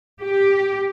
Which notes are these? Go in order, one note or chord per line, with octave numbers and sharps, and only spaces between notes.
G4